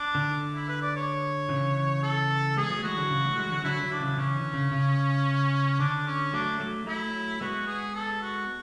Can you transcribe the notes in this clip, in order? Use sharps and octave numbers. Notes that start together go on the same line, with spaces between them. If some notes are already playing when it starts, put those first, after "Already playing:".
Already playing: D4
D3
E4
B4
D5
C#5
C#3 E3
A4
G#3 B3 G#4
F#3 A3
E3 G#3 F#4
D3 F#3
C#3 E3
F#3 A3
E3 G#3
D3 F#3
D3 F#3 E4
D3 F#3
D4
C#3 E3
C#3 E3 C#4
D3
C#3
C#3
D3 D4
C#4
F#3 A3 D4
F#3 A3
F#3 A3 E4
G#3 B3 F#4
G#4
A4
F#4